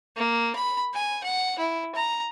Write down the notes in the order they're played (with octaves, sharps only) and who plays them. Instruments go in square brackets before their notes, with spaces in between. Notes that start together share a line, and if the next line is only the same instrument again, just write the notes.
[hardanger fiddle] A#3
B5
G#5
F#5
E4
A#5